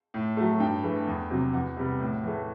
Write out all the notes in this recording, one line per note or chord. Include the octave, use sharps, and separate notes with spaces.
A2
F#3 A3
G2 G5
E3 A3
E2
C3 F#3
E2 F#5
C3 G3 B3
A2
E3 A3